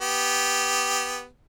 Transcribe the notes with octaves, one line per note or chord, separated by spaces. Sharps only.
B3 G4